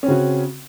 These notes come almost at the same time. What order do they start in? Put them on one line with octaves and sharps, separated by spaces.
C#4 C4 C#3 F#4